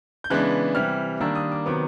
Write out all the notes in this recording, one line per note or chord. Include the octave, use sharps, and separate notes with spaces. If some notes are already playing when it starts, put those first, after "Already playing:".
G6
C#3 E3 G#3 B3 D4 F#6
C3 E3 G3 F6
D#3 G3 A#3 D4 E6
D#6
D6
C3 D#3 F#3 B3 D6